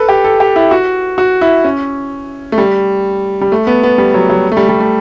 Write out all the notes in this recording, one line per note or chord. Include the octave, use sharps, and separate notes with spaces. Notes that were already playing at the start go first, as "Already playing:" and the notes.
Already playing: A4 B4
G4
A4
G4
E4
F#4
F#4
E4
C#4
A3
G3
G3
A3
B3
B3
G3
F#3
F#3
A3
G3
G3
A3